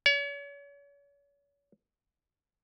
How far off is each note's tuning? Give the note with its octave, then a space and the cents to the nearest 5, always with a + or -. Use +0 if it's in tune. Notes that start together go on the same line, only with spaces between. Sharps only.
C#5 +40